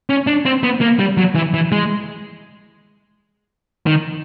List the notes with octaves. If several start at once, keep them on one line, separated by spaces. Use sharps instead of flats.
C#4
D4
C4
B3
A#3
G3
F#3
E3
E3
G#3
D#3